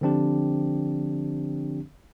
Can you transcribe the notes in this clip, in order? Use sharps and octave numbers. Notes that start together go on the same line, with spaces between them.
D3 F3 C4 D4 G4